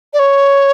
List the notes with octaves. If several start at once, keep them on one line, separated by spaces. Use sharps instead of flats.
D5
C#5